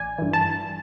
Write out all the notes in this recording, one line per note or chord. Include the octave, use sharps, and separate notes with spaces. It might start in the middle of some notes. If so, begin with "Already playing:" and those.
Already playing: A1 D5 G#5
G2 E3
A5